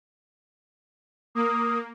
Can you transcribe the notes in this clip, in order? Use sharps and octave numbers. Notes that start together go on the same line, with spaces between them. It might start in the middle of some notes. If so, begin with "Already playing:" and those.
A#3 D#6